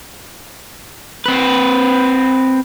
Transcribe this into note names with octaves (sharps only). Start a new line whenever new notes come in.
C4 B4